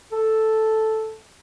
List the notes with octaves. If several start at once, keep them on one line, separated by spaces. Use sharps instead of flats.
A4